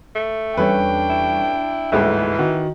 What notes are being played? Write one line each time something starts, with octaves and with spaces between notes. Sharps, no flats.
A3
E2 G3 C#4 D4 A4 B4 G5 C#6
E4
G1 D2 G#2 E3 G#4 A4 E5
D#3 F#4